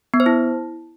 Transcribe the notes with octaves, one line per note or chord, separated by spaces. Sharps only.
B3
C5
E4